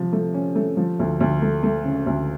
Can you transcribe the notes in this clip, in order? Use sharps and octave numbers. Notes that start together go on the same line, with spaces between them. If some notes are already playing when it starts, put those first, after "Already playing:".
Already playing: C3 F3
A3
C#4
A3
F3
D2
D2
A3
A3
C#3
D2